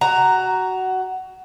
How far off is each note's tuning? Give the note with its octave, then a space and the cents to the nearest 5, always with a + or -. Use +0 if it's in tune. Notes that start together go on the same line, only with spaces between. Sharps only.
F#4 +15 A#5 +0